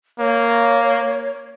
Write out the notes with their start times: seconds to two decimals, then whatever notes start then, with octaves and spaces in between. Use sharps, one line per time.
0.19 A#3 C#5